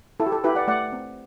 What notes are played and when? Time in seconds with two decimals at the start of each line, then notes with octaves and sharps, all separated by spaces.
0.20 E4 A4
0.26 G4
0.32 A4
0.44 E4 G4 B4
0.55 D5 F#5
0.68 A3 D5 F#5
0.92 C4